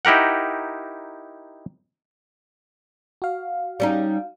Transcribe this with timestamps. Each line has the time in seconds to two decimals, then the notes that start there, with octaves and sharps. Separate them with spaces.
0.05 D#4 E4 G4 A#4 F#5
3.22 F#4 F5
3.80 G3 C#4 D#4